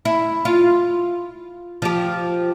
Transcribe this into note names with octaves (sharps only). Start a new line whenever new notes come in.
E4
F4
F3 G4